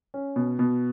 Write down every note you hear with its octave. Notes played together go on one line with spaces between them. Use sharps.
C#4
B2
B2